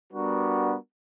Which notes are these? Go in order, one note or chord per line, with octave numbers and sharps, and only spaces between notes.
G3 B3 D4 F#4 A#4